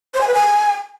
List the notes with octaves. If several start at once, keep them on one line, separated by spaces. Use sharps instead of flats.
C5
G#5
B4
G#5